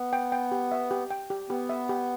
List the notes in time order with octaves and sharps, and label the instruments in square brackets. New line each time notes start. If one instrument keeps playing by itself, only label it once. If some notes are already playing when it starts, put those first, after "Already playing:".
Already playing: [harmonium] B3
[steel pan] G5
G5
G4
E5
G4
G5
G4
[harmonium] B3 [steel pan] G4
[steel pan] E5
G4